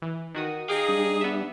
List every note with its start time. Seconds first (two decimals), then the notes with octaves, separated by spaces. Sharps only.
0.02 E3
0.35 D#3 F#4 D#6
0.68 D#4 G#4 F5 G5 D6
0.89 G3 D4
1.21 B3 E5